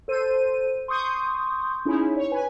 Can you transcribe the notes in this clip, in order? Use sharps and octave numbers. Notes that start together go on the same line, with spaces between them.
A4 C5 D#7
C6 C#6 D#6 G6
C#4 D#4 E4 G#4
C#5
B4 G#5